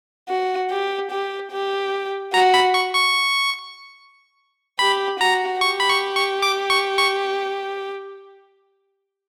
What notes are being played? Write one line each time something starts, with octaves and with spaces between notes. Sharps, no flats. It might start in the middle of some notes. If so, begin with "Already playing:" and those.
F#4
G4
G4
G4
F#4 A#5
B5
C#6
C#6
G4 B5
F#4 A#5
G4 C#6
B5
C#6
C#6
D6
C#6
C#6